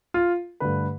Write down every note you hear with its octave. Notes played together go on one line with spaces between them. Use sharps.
F4
G2 D3 A3 B4